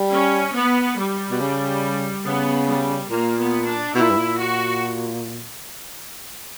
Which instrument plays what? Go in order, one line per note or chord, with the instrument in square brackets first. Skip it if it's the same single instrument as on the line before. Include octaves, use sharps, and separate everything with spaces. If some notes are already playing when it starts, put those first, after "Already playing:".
Already playing: [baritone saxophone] G3
[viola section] C#4
B3
G3
[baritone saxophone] B2
C#3
[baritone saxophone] C#3 [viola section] B3
[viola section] G3
[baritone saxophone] A#2 [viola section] A#3
[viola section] B3
D4
[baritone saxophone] B2 [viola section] E4
[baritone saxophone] A#2
G2
A#2
[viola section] F#4